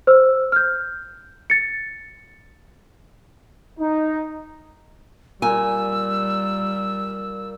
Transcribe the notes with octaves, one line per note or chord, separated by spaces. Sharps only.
C5 E6
F6 G6
A6 C#7
D#4
A#2 G3 G#5 E6